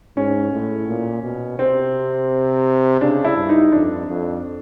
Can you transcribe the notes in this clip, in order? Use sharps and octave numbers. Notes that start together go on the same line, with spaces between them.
G#2 C#4
A2
A#2
B2
C3 C4
C#3 D4
E4
G2
D#4
F2 D4
F2